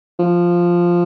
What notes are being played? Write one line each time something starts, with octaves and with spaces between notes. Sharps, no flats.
F3